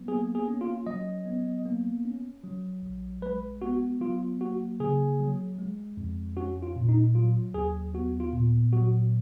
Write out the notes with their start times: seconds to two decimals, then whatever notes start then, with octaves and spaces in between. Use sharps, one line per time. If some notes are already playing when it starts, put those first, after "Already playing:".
Already playing: F#3 B3
0.08 A#3 G#4
0.35 G#4
0.48 C#4
0.61 F4
0.86 F#3 D#5
1.26 B3
1.66 A#3
2.05 C#4
2.44 F#3
2.83 A#1
3.22 G#3 B4
3.62 B3 F#4
4.01 F#3 F4
4.41 A#3 F#4
4.80 C#3 G#4
5.20 F#3
5.59 G#3
5.97 F2
6.37 C#4 F#4
6.62 F4
6.76 A#2
6.89 D#4
7.15 F#3 F4
7.54 D#2 G#4
7.94 B3 F#4
8.20 F4
8.33 A#2
8.73 F#3 F#4